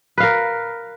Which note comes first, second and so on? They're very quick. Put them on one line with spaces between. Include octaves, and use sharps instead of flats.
B4 F5 A#4